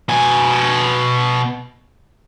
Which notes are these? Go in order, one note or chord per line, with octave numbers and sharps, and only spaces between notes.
B2 G#5